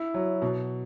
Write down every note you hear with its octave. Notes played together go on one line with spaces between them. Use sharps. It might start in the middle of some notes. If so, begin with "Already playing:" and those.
Already playing: E4
F#3
B2